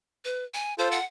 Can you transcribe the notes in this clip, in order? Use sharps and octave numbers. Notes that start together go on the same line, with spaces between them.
B4
G#5
F4 A4 C5
F#5